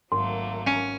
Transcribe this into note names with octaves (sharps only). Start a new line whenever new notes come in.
G#1 F#3 A3 A#3 C6
C#4